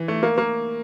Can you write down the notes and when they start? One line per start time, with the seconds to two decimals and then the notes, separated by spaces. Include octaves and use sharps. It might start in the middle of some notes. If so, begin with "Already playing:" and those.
Already playing: E3
0.08 A3
0.23 A#3
0.38 A#3